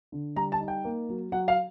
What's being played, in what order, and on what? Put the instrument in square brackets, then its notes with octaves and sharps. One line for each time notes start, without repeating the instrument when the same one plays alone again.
[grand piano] D3
G3 A#5
A5
D#4
G5
A#3
F#3
F#3 F#5
F5